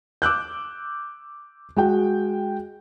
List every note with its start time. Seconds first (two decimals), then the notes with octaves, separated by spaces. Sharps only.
0.22 D6 E6 F#6 G6
1.76 G#3 F#4 G5